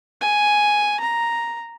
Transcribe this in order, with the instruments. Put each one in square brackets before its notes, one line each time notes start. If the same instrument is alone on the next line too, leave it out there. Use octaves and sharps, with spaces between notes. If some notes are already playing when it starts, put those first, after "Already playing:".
[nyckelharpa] G#5
A#5